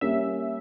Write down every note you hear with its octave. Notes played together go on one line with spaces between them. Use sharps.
G3 A#3 C#4 G4 A#4 E5